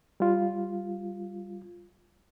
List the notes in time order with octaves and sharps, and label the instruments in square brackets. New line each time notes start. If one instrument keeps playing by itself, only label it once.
[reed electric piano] G3 F4